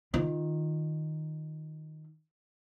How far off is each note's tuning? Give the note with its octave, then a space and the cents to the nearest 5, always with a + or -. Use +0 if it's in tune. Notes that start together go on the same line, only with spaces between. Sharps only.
D#3 -5 F4 +0